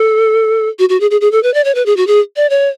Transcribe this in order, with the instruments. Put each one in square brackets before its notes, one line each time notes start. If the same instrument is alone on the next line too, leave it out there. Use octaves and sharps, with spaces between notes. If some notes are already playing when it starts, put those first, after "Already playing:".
Already playing: [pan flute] A4
F#4
F#4
G#4
G#4
G#4
A4
B4
D5
C#5
B4
G#4
F#4
G#4
D5
C#5